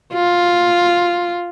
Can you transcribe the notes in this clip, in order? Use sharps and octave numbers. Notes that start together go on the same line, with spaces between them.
F4